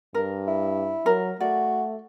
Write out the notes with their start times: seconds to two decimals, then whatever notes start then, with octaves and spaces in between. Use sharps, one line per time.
0.15 G2 A#4
0.48 E4
1.06 F#3 A#4
1.40 A3 F#4 D5